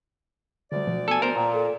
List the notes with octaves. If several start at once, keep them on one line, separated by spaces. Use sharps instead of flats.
D2 D3 G3 D5
B2 F3 F#3
B3 A4 G#5
B3 A#4 C5
A#2 G5 A#5 C6
A4